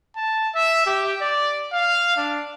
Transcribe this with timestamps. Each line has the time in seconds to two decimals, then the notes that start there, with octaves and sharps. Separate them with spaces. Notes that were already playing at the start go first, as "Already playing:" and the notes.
0.16 A5
0.55 E5
0.86 G4
1.21 D5
1.73 F5
2.17 D4